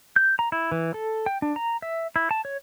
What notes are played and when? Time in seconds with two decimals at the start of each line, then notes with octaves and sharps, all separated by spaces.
0.16 G6
0.39 A#5
0.52 E4
0.72 E3
0.94 A4
1.26 G5
1.42 D4
1.56 A#5
1.82 E5
2.16 E4
2.31 A5
2.45 C#5